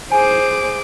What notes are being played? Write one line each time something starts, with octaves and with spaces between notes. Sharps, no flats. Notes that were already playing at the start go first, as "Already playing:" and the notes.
G#4 C5 G#5 D6